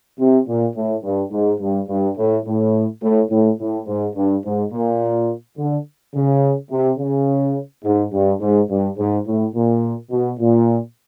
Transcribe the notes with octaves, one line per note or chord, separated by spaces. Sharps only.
C3
A#2
A2
G2
G#2
G2
G2
A2
A2
A2
A2
A2
G#2
G2
G#2
A#2
D3
C#3
C3
C#3
G#2
G2
G#2
G2
G#2
A2
A#2
B2
A#2